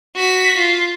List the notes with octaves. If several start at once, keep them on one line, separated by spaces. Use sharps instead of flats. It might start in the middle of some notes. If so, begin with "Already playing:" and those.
F#4 B6
F4